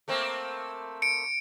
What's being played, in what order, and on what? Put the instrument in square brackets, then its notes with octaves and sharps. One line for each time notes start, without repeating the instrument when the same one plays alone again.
[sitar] A3 A#3 C4
[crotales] C#7 D7